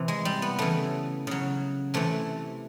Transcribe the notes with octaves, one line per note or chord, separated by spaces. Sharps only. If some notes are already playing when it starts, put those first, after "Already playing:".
Already playing: C3 E3
G#3
G3
B3
C#3 E3 A3
C#3 F#3
C3 E3 A3